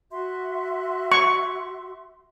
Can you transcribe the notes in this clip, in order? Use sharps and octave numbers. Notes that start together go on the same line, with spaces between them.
F#4 E5 C6
C#6